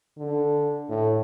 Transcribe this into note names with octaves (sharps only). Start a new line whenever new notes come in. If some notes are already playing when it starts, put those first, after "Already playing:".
D3
A2